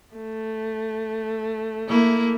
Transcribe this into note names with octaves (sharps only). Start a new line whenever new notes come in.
A3
A#3 E4